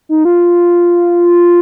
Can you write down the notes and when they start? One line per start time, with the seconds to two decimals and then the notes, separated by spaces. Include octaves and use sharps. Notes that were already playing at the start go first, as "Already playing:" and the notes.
0.09 D#4
0.25 F4